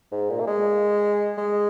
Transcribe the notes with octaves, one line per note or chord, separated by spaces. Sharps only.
G#2
A#2
A#3
G#3
G#3